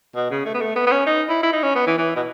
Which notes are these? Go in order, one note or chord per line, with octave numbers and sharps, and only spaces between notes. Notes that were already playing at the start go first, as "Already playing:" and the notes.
B2
C#3
A3
B3
A3
B3
B3
C#4
D#4
E4
E4
D#4
C#4
B3
E3
E3
B2